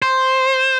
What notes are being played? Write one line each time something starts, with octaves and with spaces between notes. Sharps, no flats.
C5